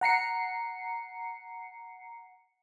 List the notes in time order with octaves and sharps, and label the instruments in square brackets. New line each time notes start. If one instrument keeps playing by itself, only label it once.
[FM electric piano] F#5 A#5 C7 C#7